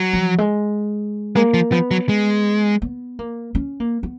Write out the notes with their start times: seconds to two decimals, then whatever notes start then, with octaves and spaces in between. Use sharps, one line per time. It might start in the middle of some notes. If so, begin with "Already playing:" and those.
Already playing: F#3
0.13 F3
0.38 G#3
1.35 G#3 A#3
1.54 F3
1.72 F3 B3
1.91 F#3
2.09 G#3
2.82 B3
3.19 A#3
3.55 C#4
3.80 A#3
4.03 B3